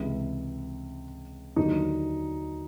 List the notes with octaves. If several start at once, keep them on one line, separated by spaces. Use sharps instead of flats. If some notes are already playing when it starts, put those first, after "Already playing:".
Already playing: C#2 C3 E3 G#3 E4
D#2 D3 F#3 D#4